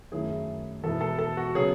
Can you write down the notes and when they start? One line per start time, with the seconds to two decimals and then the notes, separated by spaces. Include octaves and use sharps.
0.12 F#2 D#3 A3 E4 G#4
0.83 E2 B2 G#3 B3 E4 A4
1.01 A4
1.18 A4
1.37 F#4
1.55 C#3 F#3 B3 G#4